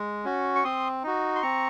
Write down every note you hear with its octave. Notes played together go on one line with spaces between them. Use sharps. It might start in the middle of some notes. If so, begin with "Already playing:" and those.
Already playing: G#3
C#4 F#4
C#6
C4 C6 D#6
D#4 F#4
C6
C4 A#5 C#6